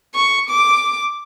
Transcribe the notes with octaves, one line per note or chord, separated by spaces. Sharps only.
C#6
D6